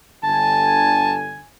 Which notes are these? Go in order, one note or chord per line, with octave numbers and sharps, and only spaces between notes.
G1 D3 G#5 A5